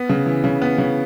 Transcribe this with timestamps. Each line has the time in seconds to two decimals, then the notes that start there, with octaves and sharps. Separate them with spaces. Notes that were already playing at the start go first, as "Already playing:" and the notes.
Already playing: B3
0.09 C#3
0.26 E3
0.44 C#3
0.62 B3
0.78 C#3